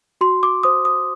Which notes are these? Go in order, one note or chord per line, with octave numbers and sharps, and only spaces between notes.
F#4 C6
D6
C5 D#6
D#6